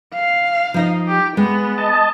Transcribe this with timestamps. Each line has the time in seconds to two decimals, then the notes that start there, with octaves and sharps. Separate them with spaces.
0.14 F5
0.74 F3 D#4 D#5
1.07 G4
1.37 G#3 B3
1.78 D#5 A5